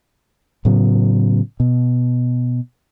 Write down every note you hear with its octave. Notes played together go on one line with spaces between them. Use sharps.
A2 C#3 F#3 B3
B2